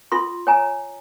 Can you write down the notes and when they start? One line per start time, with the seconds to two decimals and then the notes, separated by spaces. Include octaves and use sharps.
0.12 F4 A4 C6
0.47 C#5 G#5 A#5